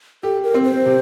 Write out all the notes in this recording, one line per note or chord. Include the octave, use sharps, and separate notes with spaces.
G4 A4
A#4
C4
C5
C3